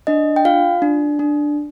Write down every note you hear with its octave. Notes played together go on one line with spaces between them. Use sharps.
D4 D#5
G5
F4 F5
D4
D4